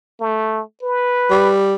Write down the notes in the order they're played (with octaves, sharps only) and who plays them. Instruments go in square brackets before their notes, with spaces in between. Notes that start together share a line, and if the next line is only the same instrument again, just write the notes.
[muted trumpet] A3
B4
[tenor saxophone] G3